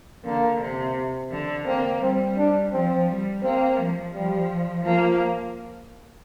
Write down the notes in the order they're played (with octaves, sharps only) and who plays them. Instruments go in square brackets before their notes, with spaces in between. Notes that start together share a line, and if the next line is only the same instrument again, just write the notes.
[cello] D3 [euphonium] A#3
[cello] C3
D3
[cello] A#3 [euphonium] C4
[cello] G3 [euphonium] C4
[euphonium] D4
[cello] F3 [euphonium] C4
[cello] G3
[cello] A#3 [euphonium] C4
[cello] F3
[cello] F3 [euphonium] G3
[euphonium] F3 [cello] A#3